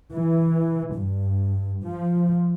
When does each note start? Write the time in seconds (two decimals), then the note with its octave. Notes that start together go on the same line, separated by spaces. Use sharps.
0.12 E3
0.95 G2
1.83 F3